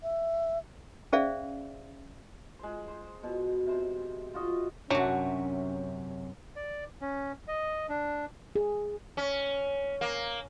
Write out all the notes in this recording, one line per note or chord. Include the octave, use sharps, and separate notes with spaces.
E5
C#4 G#4 C5 D5 E5 F5
G#3 C5
C5
B2
C3 C5
F4 F#4 D#5
F#2 C3 F#3 C#4 D4 F#4
D5
C#4
D#5
D4
G#4
C#4
A#3